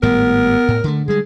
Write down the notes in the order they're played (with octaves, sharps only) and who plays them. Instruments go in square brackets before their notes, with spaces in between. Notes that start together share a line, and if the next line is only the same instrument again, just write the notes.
[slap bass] G#1 A2 G3 [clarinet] B3 [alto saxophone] A#4
[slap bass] A2
D3 A3
[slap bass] D3 G3 G#3 [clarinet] G#4